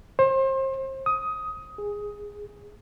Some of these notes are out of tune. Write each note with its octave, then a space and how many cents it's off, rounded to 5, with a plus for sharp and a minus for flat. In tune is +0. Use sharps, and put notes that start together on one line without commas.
C5 +35
D#6 +15
G#4 -10